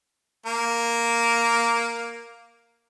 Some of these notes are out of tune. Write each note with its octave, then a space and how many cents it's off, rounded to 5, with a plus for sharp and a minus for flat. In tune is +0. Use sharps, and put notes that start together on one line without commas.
A#3 +0 A#4 +0